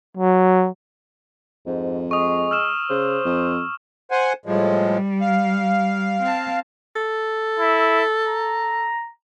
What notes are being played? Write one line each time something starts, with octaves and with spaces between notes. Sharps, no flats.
F#3
F2 G#2
G#3 C#6 D#6
E6 F6 E7
C#3 C5
F2
C5 F#5 G#5
A2 F3 G3 G#3
F5
C4 A5
A4
E4
A#5